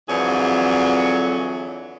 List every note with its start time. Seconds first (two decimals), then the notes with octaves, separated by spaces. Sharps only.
0.09 F2 D3 E3 F#3 G#4